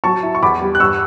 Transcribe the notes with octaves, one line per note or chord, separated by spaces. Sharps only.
F#3 A5 C#6
E4
C#6
E2 B5 D6
G3
F#6
G2 C#6 E6